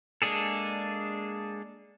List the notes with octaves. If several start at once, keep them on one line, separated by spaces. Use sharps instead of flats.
G#3 A#3 D4 G#4 A4